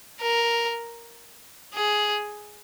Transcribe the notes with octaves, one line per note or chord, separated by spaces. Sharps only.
A#4
G#4